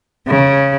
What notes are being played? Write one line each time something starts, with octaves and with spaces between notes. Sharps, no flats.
C#3